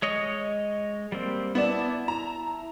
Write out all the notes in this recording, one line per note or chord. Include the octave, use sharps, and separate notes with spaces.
G#3 C#5 D#5
G3 A#3 C4
B3 E4 D5 A5
A#5